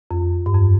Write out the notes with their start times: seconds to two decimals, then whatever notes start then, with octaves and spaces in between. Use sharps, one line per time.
0.11 F2
0.46 G2
0.55 F2